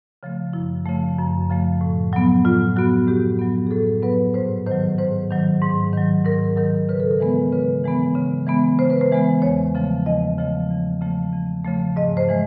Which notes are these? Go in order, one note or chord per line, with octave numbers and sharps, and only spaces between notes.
C#3 F3 A3
F#2 E4
C#3 F3 A3
F#2
C#3 F3 A3
A2
F#3 B3
A2 F4
F#3 B3 F#4
A2 G4
F#3 B3
G#4
A2 A4
F#3 B3 B4
G#2 C5
D#3 F#3 C5
G#2 C5
D#3 F#3
G#2
D#3 F#3
G#2 A#4
D#3 F#3 A#4
C#3 B4
A4
A#4
E3 G#3 B3 B4
C#3 B4
E3 G#3 B3
C#3
E3 G#3 B3
C#3 C5
B4
C5
E3 G#3 B3
E2 C#5
C#3 F3 A3
E2 D#5
C#3 F3 A3
E2
C#3 F3 A3
E2
C#3 F3 A3
G#2 D#5
C5
E3 G#3